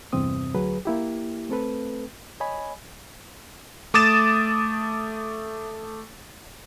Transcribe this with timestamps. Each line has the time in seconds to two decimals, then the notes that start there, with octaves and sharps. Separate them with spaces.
0.13 E2 G2 C3 C4 D#6
0.54 D2 F#3 G#4 B4
0.85 A#3 E4 G4
1.49 A3 C4 A4 B4
2.40 C#5 D#5 G#5 B5
3.94 A3 D6 D#6 A6 E7